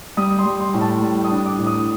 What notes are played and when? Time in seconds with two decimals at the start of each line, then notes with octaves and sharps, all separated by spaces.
0.17 G3 D#6
0.39 C6
0.46 G3
0.60 C6
0.74 A2
0.81 A5
1.02 G3
1.24 D#6
1.31 D4
1.46 D6
1.59 A2
1.66 D#6